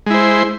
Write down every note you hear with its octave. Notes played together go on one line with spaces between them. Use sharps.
G#3 E4 C5